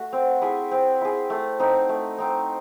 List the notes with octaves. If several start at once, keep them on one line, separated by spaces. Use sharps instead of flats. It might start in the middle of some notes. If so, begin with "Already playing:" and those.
Already playing: A3 F#4
C4
E4 G#4
C4
E4 G#4
A3
C4 D#4
A3
C4 D#4